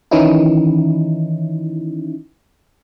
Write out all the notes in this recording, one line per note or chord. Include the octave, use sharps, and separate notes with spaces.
D#3 E3 C#4 D#4 E4